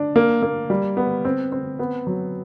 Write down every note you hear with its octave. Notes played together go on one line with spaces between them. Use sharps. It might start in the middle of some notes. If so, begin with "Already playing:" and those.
Already playing: D4
A#3
A#3
G3
B3
C4
C4
B3
F#3